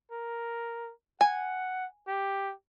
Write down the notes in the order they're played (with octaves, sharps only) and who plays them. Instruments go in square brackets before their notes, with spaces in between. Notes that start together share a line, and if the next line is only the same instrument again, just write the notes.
[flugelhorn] A#4
[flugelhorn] F#5 [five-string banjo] G#5
[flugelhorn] G4